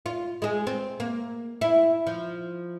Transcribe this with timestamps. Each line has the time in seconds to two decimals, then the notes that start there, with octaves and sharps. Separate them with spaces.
0.06 F4
0.42 G#3 G#4
0.67 C4
1.00 A#3
1.61 E4
2.07 F3